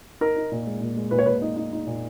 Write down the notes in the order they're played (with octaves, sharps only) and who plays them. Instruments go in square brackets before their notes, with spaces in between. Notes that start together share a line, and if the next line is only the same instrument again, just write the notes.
[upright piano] D#4 [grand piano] A#4
[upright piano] D#4
A#2
G#3
A#2
G#3
[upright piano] A#2 [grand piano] B4
[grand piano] C#5
[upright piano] A#2 [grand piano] B4
[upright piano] D#4
D#4
D#4
A#2